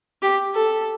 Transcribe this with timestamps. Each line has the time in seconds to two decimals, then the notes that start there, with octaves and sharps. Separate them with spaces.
0.22 G4
0.55 A4